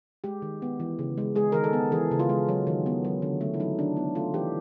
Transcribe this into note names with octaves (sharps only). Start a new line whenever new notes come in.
G#3 G4
D#3
B3
E3
C#3
G#3
G#3 G#4
D#3 A#4
A4
B3
E3 G#4
C#3
F4
G#3
F#3
D#3
B3
F#3
D3
A3
E4
F#3 D#4
D#3 D4
B3 D#4
A3 F4
E3 G4